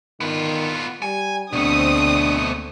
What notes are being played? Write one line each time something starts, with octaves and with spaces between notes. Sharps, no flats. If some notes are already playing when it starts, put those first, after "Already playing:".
D#3 B3 F4
G3 G#5
D2 B2 A3 C4 D4 D#6